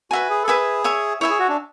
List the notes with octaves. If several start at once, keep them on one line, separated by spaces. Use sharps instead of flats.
F#4 B4 E5 G#5
G#4
A4
G#4 B4 E5 G#5
C#5 E5 G#5
E4 C#5 E5 G#5
G#4
F#4
D4